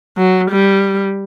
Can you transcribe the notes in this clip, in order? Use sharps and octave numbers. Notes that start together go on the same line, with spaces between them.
F#3
G3